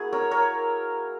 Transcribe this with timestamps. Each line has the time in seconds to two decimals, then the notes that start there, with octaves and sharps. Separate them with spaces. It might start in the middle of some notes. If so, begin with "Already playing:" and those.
Already playing: A#3 E4 F#4 G#4
0.13 A#4 C#5
0.31 A#4 C#5